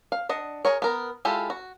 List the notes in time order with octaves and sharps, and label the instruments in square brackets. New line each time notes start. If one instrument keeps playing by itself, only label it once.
[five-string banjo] F5
D4 D#5 F#5
G#4 A#4 C#5
B3 A#4
G#3 E4 F4 G4 A4
F#4